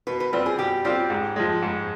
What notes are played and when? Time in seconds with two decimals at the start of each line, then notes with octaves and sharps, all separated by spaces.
0.07 B2 B4
0.20 B4
0.33 G3 C4 F4 B4
0.46 G#4
0.58 B2 G4
0.84 G3 C4 F4 G4
1.10 G#2
1.36 F3 G#3
1.62 G#2